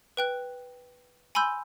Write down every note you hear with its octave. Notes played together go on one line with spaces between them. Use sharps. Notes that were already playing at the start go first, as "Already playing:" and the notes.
B4 G5 F#6
G#5 B5 C6 E6 G6